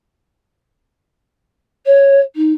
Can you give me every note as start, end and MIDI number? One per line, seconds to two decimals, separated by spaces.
1.86 2.20 73
2.35 2.52 63